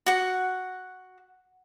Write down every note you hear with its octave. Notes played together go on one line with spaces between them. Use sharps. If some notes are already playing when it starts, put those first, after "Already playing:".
F#4 F#5